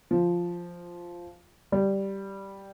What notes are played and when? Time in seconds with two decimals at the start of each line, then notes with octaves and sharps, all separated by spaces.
0.11 F3
1.72 G3